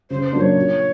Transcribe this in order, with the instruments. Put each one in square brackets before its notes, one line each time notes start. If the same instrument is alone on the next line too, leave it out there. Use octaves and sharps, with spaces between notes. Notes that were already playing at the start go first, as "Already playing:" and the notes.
[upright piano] C#3 [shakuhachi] C5
[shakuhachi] C5
[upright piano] F#3 A#3 D4
[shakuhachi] C#5
[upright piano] A#2